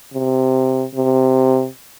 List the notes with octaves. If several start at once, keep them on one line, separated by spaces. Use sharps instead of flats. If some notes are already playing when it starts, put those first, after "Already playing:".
C3
C3